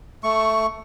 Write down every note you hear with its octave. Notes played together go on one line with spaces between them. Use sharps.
A3 C#6